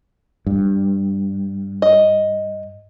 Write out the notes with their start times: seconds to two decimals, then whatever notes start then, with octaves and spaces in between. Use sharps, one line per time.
0.46 G2
1.82 D#5